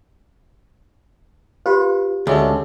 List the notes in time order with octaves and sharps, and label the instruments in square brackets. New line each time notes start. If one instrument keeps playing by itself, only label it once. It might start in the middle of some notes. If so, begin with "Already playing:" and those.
[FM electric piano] F4 B4 [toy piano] G4 C5
[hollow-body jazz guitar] D2 [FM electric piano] G#3 C#4 A4